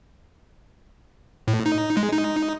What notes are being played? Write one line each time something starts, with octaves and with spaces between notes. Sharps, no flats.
A2
D#4
G#3
D#4